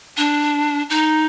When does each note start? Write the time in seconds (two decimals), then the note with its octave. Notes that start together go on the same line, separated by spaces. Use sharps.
0.17 D4
0.90 D#4